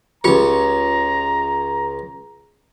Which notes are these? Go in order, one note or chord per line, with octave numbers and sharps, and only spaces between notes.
C#2 F4 G4 C#5 A#5